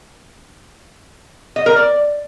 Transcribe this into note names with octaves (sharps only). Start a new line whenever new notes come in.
D#5
A#4
D5